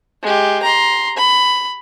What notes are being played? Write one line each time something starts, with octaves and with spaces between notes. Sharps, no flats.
G#3 G4
A#5 C6
B5